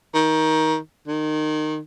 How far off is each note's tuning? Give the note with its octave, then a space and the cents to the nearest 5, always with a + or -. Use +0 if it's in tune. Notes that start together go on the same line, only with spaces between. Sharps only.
D#3 +20
D#3 -20